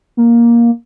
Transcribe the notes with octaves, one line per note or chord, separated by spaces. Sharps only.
A#3